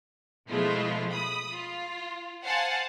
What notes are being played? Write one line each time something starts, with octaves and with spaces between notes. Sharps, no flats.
B2 F3 G#3 A3 E4 F4
B5 D#6
F4
C5 F5 F#5 G#5 A5